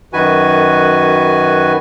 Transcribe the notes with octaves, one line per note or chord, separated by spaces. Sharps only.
F#2 D#3 F#4 B4 G#5